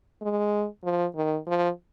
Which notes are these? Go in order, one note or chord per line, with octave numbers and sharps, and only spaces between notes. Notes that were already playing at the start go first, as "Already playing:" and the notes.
G#3
F3
D#3
F3